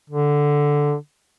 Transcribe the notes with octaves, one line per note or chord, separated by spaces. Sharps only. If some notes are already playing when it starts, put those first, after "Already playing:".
D3